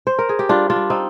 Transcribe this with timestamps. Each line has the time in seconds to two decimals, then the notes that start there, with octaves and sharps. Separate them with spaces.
0.07 C5
0.19 A#4
0.29 G#4
0.39 G4
0.49 G3 D4 F4
0.70 D4 F4
0.76 G3
0.90 C4 D#4